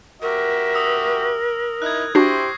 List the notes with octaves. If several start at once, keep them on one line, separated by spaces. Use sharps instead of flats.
F#4 G4 A#4 E5
D#6 E6
D#4 E4 F#6 G#6
D4 E4 F#4 G4 C5 C#6 A#6 C7